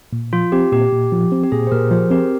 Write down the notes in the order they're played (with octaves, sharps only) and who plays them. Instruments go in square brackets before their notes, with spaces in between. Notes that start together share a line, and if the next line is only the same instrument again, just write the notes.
[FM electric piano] A#2
[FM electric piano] F3 [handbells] F4
[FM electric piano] C4 [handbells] G4
[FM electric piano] A#2 [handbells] G4
[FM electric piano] A#2
F3
C4
[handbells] G4
[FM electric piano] A#2 [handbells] G#4
[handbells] C5
[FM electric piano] A#2 [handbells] G4 A#4
[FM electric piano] F3 [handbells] G#4 C5
[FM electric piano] C4 [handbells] G4 A#4